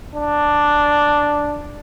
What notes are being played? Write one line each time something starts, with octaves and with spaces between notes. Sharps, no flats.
D4